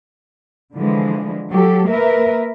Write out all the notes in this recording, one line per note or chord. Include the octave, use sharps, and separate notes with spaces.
D3 E3 F3 G#3
F#3 G4 A4
A#3 A#4 B4 E5